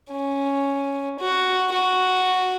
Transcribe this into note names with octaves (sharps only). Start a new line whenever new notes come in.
C#4
F#4
F#4